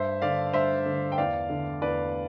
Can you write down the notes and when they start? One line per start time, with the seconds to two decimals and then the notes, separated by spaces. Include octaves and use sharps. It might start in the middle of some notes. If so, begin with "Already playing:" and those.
Already playing: G2 C5 E5
0.22 D3 D5 F5
0.53 G2 C5 E5
0.86 D3
1.12 G5
1.18 E2 D5 F5
1.50 D3
1.82 E2 B4 D5